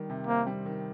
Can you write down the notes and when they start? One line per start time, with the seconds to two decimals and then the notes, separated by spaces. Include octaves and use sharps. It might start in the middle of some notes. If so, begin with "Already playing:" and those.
Already playing: D#3 G3
0.10 C3
0.27 A#3 C4
0.47 G3
0.65 D#3